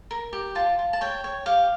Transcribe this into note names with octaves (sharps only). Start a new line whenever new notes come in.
A#4
G4
F4 A5
F4
A5
C#5 G5
C#5
G4 F5